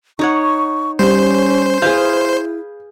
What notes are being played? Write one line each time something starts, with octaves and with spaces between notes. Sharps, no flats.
D#4 C#5 F#5 C#6
G3 C#4 C5
E4 G#4 B4 F5 G6